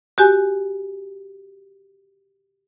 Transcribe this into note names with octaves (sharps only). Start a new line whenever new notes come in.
F#4 G4 G#5